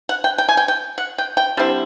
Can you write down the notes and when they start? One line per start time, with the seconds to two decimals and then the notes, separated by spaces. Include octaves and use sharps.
0.09 F#5
0.24 G5
0.38 G5
0.48 G#5
0.57 G5
0.68 G5
0.98 F#5
1.18 G5
1.37 G5
1.57 D3 G3 C4 E4